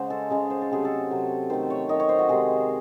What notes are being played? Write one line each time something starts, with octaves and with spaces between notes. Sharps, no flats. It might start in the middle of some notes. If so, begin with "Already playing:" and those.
Already playing: C#3 G#3 C5 D#5 F#5
A4
C#3 G#3 G#4
C5
A4
C3 F#3 A3 G#4
A4
C3 F#3 A3
D#3 A3 C5
C#5
D#3 A3 D#5
C#5
C5
F#4
C3 D#3 G#3 G#4